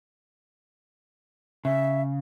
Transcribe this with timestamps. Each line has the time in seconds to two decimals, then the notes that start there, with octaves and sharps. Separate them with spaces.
1.65 C#3 E5